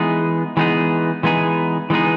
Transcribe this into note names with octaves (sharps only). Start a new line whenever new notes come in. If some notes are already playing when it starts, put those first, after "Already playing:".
Already playing: E3 G#3 B3 D#4 G#4
E3 G#3 B3 D#4 G#4
E3 G#3 B3 D#4 G#4
E3 G#3 B3 D#4 G#4